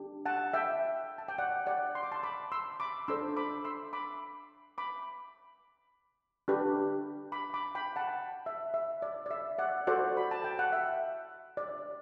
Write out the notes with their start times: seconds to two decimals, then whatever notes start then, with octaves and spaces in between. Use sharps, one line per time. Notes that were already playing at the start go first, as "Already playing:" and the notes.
Already playing: D4 G4
0.26 F#5 A5
0.54 E5 G5
1.18 A5
1.28 G5
1.38 D5 F#5
1.66 D5 F#5
1.95 C6
2.03 D6
2.12 A5 C6
2.23 B5 D6
2.52 C6 E6
2.80 B5 D6
3.08 D4 A4 C5 C6 E6
3.37 B5 D6
3.65 C6 E6
3.93 B5 D6
4.78 B5 D6
6.48 D4 G4 B4
7.32 B5 D6
7.54 B5 D6
7.75 G5 B5
7.96 F#5 A5
8.46 E5
8.74 E5
9.02 D5
9.26 D5
9.31 E5
9.59 D5 F#5
9.87 F#4 A4 C5 D5 F#5
10.17 B5
10.31 A5
10.44 G5
10.59 F#5
10.72 E5
11.57 D5